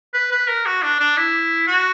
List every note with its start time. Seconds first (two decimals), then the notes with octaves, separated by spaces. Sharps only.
0.14 B4
0.32 B4
0.48 A#4
0.66 F#4
0.83 D4
1.00 D4
1.17 E4
1.67 F#4